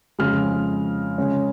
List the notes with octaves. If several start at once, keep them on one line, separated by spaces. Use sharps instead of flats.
F2 C#3 G#3 F6
C#3 G#3 C#4